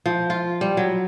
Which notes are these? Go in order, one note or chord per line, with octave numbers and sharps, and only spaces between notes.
F3
F4
G3
F#3